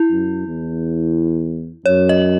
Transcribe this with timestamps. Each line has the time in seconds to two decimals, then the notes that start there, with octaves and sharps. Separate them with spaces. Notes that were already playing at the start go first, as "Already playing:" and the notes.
Already playing: E4
0.11 F#2
0.47 E2
1.86 F#2 C#5
2.09 D#5